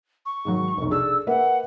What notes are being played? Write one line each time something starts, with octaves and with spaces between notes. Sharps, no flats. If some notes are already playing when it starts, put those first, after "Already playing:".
C#6
G#2 D#3 F#3
F1 B1
D4 G#4 A4 E6
A#3 B4 E5 F#5